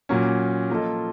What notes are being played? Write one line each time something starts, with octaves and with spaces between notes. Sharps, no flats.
A#2 F#3 A#3 C#4
F3 A#3 F4 A4 D#5